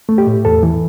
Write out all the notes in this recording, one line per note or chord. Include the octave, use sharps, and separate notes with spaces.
A3
G4
A2
E2 A4
E3